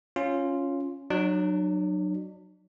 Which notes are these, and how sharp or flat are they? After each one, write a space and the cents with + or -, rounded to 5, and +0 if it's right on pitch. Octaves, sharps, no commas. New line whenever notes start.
C#4 +0 F4 +0
F#3 +0 D4 +45 D5 -45